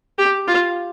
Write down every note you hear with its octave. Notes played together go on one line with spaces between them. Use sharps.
G4
F4